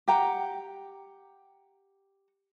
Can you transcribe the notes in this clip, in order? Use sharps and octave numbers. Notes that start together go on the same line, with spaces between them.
G4 F#5 G5 A#5